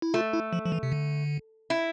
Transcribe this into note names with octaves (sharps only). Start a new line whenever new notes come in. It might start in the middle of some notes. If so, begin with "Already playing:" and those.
E4
A3 F4
E4
F3
F3
E3
C3
D3
E4